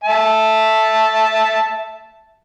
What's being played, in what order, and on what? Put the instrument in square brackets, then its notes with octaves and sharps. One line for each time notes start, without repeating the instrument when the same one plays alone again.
[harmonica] E5 A5